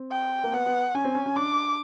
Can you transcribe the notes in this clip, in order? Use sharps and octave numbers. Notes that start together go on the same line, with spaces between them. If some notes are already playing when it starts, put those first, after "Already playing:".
Already playing: C4
G5
A#3
B3 F#5
B3
C#4 G#5
C4
C#4
C#4
D4 D6